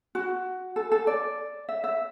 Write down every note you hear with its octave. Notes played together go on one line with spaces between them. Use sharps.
F#4
A4
A4
D5
E5
E5